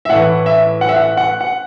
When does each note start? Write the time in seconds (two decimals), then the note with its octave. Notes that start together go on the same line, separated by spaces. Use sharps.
0.05 E5
0.09 A2 E3 F#5
0.46 E5
0.81 F#5
0.89 E5
0.96 F#5
1.17 F#5
1.41 F#5